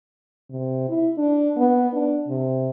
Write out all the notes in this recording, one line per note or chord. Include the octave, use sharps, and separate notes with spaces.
C3
E4
D4
B3
D4
C3